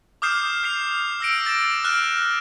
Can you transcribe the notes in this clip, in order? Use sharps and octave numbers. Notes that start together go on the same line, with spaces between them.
D6 D#6 F6 G6 C7 E7
F6 C7 F7
E6 F6 A#6 C#7 D7
A6 A#6 E7
F6 F#6 E7